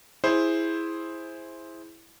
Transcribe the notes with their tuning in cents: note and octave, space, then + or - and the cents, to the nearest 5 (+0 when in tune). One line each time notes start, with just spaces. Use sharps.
E4 +0 G#4 +0 C5 +5